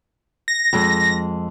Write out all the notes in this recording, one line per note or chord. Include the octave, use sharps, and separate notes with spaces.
A#6
F2 G#3